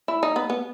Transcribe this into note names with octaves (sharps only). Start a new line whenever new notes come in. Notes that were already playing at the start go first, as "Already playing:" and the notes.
E4
D#4
B3
B3